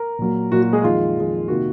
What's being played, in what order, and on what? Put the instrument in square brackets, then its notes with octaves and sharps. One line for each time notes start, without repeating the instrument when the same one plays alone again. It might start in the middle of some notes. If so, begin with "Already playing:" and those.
Already playing: [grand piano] A#4
A#2 F#3 A#3
A#2 F#3 A#3 F#4
F#4
G#3 G#4
F2 D#3 G#3 F4
F2 D#3 G#3
C3 D#3 A#3 F#4